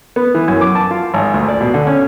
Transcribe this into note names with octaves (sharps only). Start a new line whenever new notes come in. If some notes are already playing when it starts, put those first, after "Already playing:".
B3
E3
F#2
D6
A5
F4
G#1
D2
D5
B2
D3
C#4